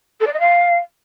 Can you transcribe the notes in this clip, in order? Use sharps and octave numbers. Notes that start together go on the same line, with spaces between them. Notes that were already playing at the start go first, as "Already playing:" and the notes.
A4
D5
D#5
F5